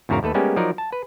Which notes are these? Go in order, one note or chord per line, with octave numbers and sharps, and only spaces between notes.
E2 G#2 C#3 F#4 A#4 F5
D#2 A3 A4 B4
G3 G#3 A#3 B3 C#4 G4
F3 F#3 D#4 A#4 D5
A5
B4